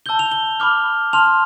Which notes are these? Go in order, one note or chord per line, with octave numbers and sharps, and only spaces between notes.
A5 E6 G6 G7
F7
G7
B5 D6 F6
A5 C6 F6 F7